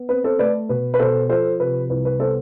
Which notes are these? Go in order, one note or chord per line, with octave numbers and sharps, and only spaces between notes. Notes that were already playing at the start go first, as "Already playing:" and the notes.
Already playing: B3
C4 B4
A4 C5
A3 B4 D5
B2 B4
B4
B2 A4 C5
F3 A4 C5
C3 B4
C2 B4
B4
B3 A4 C5